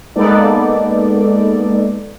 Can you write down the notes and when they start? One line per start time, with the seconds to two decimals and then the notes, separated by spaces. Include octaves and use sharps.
0.16 G#3 A#3 B3 D#4 A4 D5